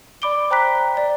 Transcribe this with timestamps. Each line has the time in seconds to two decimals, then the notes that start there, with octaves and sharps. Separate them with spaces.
0.22 D5 B5 D6 D7 G7
0.50 C5 G5 A#5 B5 F#6 B6
0.97 D5